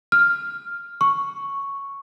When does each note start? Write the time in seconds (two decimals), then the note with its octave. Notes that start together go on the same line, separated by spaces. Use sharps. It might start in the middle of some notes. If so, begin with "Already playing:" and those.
0.12 F6
1.01 C#6